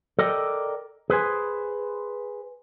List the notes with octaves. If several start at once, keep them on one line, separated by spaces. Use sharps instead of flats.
A4 A#4 D5 D#5 G5
G#4 B4 C5 G#5